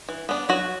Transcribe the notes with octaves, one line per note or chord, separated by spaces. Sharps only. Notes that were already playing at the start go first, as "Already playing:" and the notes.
E3
B3 D4
F#3 F#4